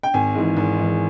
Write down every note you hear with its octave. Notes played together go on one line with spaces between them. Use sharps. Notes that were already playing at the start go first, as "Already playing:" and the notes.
G5
G#1 G#5
G#2 E3
G#1
G#2 E3